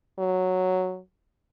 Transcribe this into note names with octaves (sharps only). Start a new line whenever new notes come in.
F#3